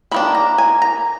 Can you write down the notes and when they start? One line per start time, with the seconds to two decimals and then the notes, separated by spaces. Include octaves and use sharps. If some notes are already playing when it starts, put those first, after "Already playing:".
0.11 D#3 A#3 D4 B5
0.35 A#5
0.58 G#5
0.82 A#5